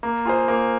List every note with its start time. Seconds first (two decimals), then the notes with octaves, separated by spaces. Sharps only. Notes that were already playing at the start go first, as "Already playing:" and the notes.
0.03 A#3
0.25 F4 G#4 C5
0.48 A#3